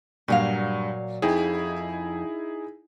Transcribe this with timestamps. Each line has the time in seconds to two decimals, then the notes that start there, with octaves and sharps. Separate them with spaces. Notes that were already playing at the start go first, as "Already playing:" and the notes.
0.28 G2 A#2 F#3 F5
1.22 F2 D#4 E4 G#4